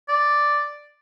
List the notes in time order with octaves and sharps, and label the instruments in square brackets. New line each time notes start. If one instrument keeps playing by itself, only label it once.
[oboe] D5